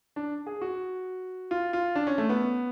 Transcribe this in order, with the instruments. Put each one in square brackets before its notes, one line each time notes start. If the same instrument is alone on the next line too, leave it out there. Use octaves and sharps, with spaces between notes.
[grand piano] D4
G#4
F#4
F4
F4
D4
C#4
A3
B3